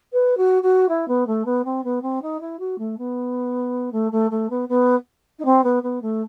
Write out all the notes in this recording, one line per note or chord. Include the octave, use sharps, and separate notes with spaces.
B4
F#4
F#4
E4
B3
A3
B3
C4
B3
C4
D#4
E4
F#4
A3
B3
A3
A3
A3
B3
B3
D#4
C4
B3
B3
A3